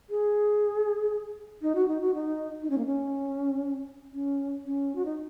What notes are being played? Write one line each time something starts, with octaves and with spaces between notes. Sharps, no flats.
G#4
D#4
F#4
D#4
F#4
D#4
D#4
C#4
A#3
C#4
C#4
C#4
F#4
D#4